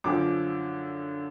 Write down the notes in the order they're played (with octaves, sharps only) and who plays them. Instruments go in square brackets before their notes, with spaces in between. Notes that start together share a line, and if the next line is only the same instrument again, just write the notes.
[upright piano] F#2 D3 F3 D6